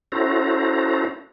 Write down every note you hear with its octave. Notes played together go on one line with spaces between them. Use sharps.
C#4 E4 F#4 A4 C5 A#5